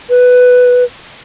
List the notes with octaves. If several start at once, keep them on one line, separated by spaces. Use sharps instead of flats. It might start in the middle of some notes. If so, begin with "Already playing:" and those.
B4